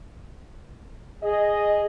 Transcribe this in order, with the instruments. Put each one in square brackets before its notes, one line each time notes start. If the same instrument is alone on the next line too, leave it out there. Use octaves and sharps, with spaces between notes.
[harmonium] G#4 [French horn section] D#5